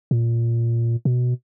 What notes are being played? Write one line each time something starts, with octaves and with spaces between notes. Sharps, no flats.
A#2
B2